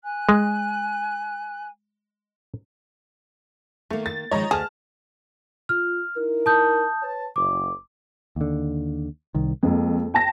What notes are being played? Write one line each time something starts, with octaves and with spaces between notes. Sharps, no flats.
G#5 F#6
G#3
D#3 A3 A#3
A6
D#3 F3 G#3 C#5 D#5 A#5
D2 G#4 A5 F6
F4 F6
D#4 E4 A#4
A5 D#6 G6
B4 C#5 A5
F#1 D6
D#2 D3
C2 D#3
F2 G#3 A#3
G5 A5 A#6